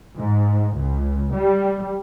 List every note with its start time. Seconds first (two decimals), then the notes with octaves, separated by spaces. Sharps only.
0.20 G#2
0.77 C#2
1.36 G3